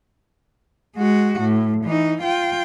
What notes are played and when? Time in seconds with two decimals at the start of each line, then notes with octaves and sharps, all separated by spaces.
0.96 G#3 F#4
1.40 A2
1.85 E3 D#4
2.22 F4 G5